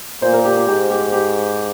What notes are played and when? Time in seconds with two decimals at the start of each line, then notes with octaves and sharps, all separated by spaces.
0.22 A#2 C5
0.33 A#4
0.45 G4
0.56 G4
0.67 G#2 G4
0.90 G4
1.12 G4